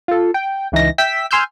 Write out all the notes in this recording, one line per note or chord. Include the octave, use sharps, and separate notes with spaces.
F4 A4
G5
C#2 E3 D#4 A#6
E5 G5 E6 B6
G#5 C6 E6 F6 G6